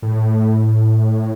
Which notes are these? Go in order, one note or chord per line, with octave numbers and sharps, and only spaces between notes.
A2